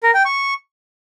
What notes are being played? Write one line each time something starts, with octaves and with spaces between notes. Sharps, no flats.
A#4
G5
C#6